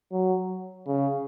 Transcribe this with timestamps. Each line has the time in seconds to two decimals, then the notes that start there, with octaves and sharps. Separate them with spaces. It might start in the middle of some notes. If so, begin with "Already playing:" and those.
0.12 F#3
0.86 C#3